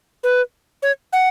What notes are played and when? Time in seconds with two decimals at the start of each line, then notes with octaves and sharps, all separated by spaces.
0.23 B4
0.82 C#5
1.13 F#5